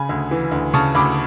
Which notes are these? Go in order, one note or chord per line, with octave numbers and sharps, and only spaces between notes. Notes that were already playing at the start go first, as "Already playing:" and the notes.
Already playing: C#3 G#5 B5
D2
E3
D2
C#3 A5 C#6
D2 B5 D6